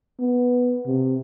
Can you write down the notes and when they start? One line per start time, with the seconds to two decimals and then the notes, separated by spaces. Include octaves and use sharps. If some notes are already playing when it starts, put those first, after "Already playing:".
0.19 B3
0.86 C3